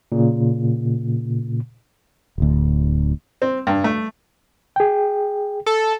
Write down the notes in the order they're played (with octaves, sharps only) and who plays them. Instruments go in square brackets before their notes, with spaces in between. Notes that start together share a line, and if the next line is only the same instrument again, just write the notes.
[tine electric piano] A#2 C#3
[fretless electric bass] D1 D2
[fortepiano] C4
G2
A3
[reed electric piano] G#4 G5
[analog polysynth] A4